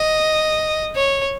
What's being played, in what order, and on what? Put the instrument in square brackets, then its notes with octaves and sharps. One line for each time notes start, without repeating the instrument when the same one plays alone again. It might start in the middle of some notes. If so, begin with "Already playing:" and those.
Already playing: [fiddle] D#5
C#5